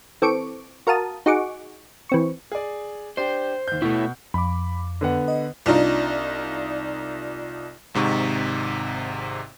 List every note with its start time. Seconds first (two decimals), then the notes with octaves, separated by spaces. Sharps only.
0.22 E3 C4 A4 C#6 D6 D7
0.87 F#4 A#4 F5 A5 D#6
1.26 D#4 F#4 G#4 F#5 C#6 D6
2.09 E3 C4 C#6
2.52 G#4 D5
3.17 D4 G4 C5
3.68 D#2 G6
3.82 B2 A3 E4
4.34 F2 B5 D6
5.01 D3 B3 F#5
5.28 D#5
5.66 C2 D4 D#4 F4
7.94 G#1 G#2 C3 D#4 C#6